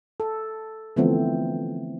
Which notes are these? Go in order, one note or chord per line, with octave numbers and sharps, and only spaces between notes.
A4
D3 E3 F3 A3 B3 C4